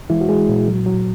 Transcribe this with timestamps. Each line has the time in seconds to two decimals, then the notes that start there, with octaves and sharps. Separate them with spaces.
0.10 E3 G#3 E4
0.21 F#4
0.29 G#3 G#4
0.48 A#2
0.68 F#3
0.86 F#3